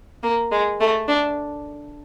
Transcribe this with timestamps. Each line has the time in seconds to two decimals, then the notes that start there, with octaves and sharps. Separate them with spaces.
0.23 A#3
0.52 G#3
0.81 A3
1.08 D4